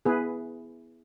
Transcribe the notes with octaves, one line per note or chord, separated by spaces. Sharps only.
B3 E4 G#4 B4